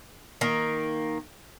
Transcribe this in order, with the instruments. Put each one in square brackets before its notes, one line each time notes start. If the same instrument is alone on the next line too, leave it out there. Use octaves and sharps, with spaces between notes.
[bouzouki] D#3 A#3